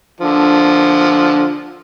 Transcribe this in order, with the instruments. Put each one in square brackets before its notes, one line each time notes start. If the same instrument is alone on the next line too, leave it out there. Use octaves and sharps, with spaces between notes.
[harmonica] D3 F3